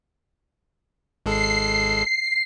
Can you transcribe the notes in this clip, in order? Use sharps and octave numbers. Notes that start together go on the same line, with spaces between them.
G#1 G#3 A4 C7